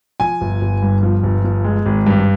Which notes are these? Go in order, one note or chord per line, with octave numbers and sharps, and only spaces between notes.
F3 G#5
G1
G1
G2
F3
G1
F3
G#3
G#1
G2